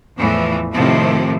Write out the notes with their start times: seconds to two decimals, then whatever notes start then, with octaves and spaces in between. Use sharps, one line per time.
0.19 E2 A2 E3 F3
0.72 A2 C3 D#3 F3